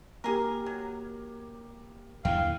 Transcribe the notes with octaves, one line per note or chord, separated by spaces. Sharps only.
A#3 G4 G#4 A#4
F#3
D#2 D3 E3 F5 G5